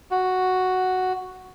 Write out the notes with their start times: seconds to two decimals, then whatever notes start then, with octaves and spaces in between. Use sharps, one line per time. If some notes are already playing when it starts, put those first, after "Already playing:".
0.11 F#4